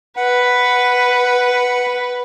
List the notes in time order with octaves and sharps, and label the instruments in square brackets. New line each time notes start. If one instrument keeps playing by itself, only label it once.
[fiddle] B4 [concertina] F#5